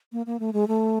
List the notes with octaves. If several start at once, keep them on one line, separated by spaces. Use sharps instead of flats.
A#3
A#3
A3
G#3
A3